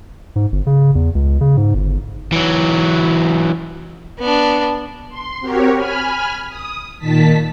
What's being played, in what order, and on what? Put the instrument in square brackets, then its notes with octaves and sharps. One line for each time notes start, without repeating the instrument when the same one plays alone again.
[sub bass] G#2
G1
C#3
E2
C#2
C#3
G#2
G1
[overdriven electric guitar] E3 F#3
[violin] B3 D4
[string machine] C6
C4 F#4 G4 A#4 C#5
G#5 B5 F6
D#6
A#2 D#3 A5 B6